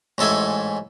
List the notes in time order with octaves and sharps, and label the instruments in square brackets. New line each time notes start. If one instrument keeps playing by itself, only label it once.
[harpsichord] A1 G#2 A4 E5 G#5